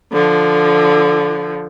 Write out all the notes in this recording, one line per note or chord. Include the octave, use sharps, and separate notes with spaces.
D3 F3